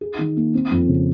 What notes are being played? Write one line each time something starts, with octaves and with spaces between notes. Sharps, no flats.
G#4
D#3
A#3
C4
F2
C#3